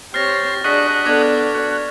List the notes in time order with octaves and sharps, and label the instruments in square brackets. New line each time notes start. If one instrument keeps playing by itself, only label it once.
[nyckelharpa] C4 C#5 [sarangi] G4 [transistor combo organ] C5 [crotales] F6 A6 A#6
[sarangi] D4 [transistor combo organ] F#4 D#5 F#5 [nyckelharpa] G#4 [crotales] C#6 B6
[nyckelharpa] B3 A4 [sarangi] D4 [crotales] D6 G#6
[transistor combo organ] F#4